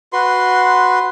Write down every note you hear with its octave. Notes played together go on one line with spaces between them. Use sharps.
F#4 B4 C6